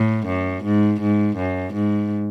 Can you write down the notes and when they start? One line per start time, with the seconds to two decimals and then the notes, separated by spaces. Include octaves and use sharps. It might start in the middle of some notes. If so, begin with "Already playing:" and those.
Already playing: A2
0.27 F#2
0.64 G#2
1.01 G#2
1.37 F#2
1.74 G#2